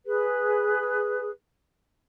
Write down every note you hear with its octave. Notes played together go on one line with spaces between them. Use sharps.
G#4 B4